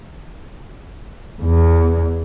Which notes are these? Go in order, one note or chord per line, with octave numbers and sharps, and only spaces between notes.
E2